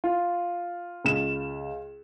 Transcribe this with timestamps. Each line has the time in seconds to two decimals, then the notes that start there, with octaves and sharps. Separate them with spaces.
0.04 F4
1.05 C#2 E7